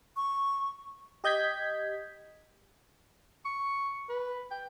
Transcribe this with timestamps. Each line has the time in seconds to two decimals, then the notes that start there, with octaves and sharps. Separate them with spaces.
0.16 C#6
1.24 G4 D#5 G6 G#6 B6
3.45 C#6
4.09 B4
4.51 G5